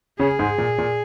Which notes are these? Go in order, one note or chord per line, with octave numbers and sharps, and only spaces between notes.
C#3 C#4 G#4
G#2 G#3
A#2
A#2